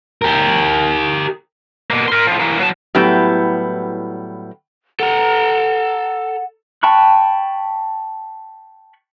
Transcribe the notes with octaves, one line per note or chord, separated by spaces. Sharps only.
G4 A#4
B2 A#3
A#4 C6
A2 F3
E3 A#3
F#3 A5
A2 F#3 G3 B3 E4 G4
A4 F#5 A#5
G5 A5 B5 C#6 F#6